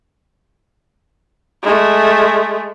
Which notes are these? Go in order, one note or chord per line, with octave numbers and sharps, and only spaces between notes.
G#3 A3